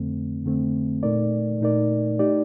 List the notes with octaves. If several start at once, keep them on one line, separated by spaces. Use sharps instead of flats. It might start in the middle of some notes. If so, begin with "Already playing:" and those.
Already playing: F2 D3 A3 C4
F2 D3 A3 C4
A#2 A3 D#4 A#4 D5
A#2 A3 D#4 A#4 D5
A3 D#4 G4 D5